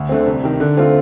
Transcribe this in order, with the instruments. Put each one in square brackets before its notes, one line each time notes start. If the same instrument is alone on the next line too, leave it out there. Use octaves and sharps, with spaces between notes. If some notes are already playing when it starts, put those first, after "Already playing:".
Already playing: [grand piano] D2
D3 A3 C4
C2
C3 D#3
D3
A3 C4 F4